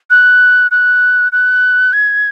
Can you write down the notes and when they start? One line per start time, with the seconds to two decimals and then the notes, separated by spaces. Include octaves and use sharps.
0.10 F#6
0.71 F#6
1.32 F#6
1.93 G#6